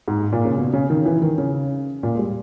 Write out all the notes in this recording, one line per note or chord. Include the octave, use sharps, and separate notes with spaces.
G#2
A#2
C#3
B2
C#3
D#3
E3
D#3
C#3
A#2
G#3
G3